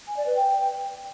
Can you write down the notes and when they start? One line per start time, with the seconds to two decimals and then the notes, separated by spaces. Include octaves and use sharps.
0.07 G#5
0.16 D5
0.26 B4
0.35 G5